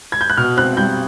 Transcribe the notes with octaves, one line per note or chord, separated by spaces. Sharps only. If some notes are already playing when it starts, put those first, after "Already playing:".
G#6
G6
F#6
B2 F6
C4 F#6
G3 G6